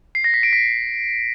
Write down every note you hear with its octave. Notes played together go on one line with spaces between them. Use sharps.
C7
A#6
B6
D7
B6